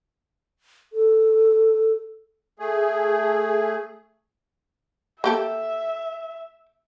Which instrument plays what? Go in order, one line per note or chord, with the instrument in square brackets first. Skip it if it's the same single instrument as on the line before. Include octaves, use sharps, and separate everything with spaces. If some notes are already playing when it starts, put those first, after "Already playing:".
[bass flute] A4
[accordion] A3 G#4
[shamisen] A#3 G4 A4 [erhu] E5